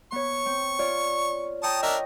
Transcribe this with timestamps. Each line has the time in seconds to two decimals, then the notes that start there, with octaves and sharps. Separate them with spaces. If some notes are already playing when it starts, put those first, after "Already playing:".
0.12 B3 C#5 C#6
0.46 C4
0.79 F4 C#5 D5
1.63 C#5 G5 A5 A#5 D#6
1.83 D4 A#4 D#5 E5